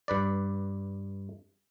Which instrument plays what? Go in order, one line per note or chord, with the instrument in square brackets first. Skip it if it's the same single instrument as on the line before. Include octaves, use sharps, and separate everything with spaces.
[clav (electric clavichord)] G2 B4 D5